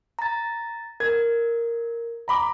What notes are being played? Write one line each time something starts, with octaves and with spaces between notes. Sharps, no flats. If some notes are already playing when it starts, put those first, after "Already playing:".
A#5 A6
A#4 G#6
A#5 B5 D6